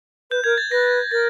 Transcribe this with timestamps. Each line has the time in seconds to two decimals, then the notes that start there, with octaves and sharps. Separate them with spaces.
0.31 B4 G6
0.44 A#4 G#6
0.58 A6
0.71 B4 A#6
1.11 A#4 A6